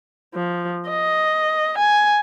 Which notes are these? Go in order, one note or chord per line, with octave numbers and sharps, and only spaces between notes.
F3
D#5
G#5